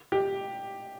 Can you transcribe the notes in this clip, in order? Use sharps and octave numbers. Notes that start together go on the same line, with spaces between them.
G4